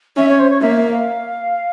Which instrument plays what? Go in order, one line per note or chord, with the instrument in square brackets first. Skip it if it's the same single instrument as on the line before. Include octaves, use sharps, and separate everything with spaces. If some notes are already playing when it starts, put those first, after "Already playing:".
[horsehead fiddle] C#4 [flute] E5
[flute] C#5
C5
C#5
[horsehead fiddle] A#3 [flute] E5
[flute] E5
F5